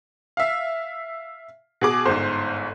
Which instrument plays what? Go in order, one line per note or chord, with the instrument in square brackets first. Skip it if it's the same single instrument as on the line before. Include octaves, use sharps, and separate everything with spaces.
[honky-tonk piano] E5 F5
B2 G#4 D6
[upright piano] G1 G#2 [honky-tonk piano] C5